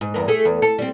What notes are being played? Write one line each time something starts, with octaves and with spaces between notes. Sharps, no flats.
G#2
E2 G2 A#4
A3 G#4
E2
A4
G3 C4